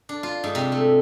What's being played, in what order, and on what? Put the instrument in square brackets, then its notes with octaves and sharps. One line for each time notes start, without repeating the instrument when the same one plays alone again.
[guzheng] D4
F4
G#2
C3
A3